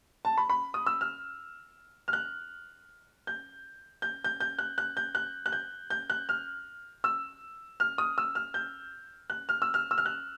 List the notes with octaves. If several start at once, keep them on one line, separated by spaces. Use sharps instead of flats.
A5
B5
B5
D#6
E6
F6
F6
F#6
G6
G6
G6
G6
F#6
F#6
G6
F#6
F#6
G6
G6
F#6
F6
E6
F6
D#6
E6
F6
G6
F#6
F6
E6
F6
E6
F6
F#6